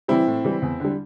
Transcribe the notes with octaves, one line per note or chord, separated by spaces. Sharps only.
E3 G3 C4 E4
A2
E3 G3
E2
D3 G3